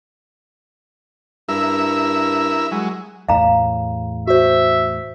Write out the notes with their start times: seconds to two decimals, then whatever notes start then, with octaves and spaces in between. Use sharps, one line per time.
1.49 G2 E4 A#4 E5
2.71 F#3 G#3
3.29 E2 A2 F5 A#5
4.27 F#4 C5 E5